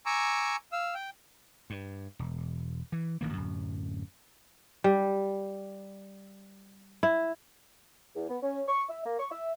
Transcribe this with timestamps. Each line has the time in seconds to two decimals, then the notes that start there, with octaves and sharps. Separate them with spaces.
0.06 G#5 A#5 C#6 D6 E6
0.72 F5 E6
0.95 G5
1.70 G2
2.19 E1
2.92 E3
3.21 A1 D#3 A#3
3.33 D1 F#2
4.84 G3
7.03 E4
8.15 E2
8.29 B3
8.43 C#4
8.67 C#6
8.89 E5
9.06 A#3
9.20 C#6
9.31 E5